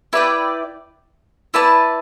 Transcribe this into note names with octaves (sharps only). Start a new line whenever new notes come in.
E4 B4 D5 G5
E4 B4 D5 A5